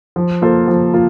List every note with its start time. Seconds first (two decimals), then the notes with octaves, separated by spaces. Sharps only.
0.16 F3
0.42 A#3 F4 A4 C5
0.68 F3
0.94 A#3 F4